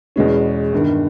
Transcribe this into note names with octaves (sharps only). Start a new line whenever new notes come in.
E2 B2 G#3 C#4
G1 G2 D#3